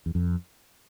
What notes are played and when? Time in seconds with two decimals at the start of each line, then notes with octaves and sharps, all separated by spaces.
0.06 E2
0.15 F2